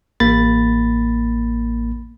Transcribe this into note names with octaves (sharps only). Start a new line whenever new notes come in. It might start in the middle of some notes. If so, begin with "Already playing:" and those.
A1 A#3 B5 A6